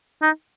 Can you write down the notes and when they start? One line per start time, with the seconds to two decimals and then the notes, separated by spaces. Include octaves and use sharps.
0.22 D#4